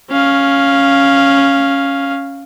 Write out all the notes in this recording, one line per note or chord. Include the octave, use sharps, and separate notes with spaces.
C#4 F5